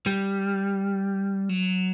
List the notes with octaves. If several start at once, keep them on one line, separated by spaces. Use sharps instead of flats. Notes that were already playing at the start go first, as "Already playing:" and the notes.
G3
F#3